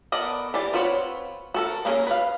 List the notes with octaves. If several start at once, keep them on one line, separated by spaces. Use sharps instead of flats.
B3 A4 A#4 D5 D#5
E3 G4 D5
C4 F4 F#4 B4 C#5
F#4 A4 A#4
A#3 B3 C#4 G#4 A#4
B4 F5